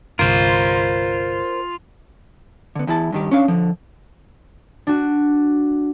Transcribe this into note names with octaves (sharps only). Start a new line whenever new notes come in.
G1 C2 F4 A#4 C5
D3 B3
E2 E4 A5
G2 D#3 G4
C#4 D4 F5
D3 F3
D4 F#4